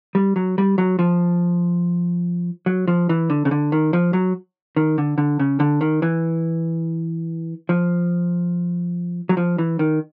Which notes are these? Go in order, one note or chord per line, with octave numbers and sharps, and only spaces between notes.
G3
F#3
G3
F#3
F3
F#3
F3
E3
D3
C#3
D3
D#3
F3
F#3
D#3
D3
D3
C#3
D3
D#3
E3
F3
F#3
F3
E3
D#3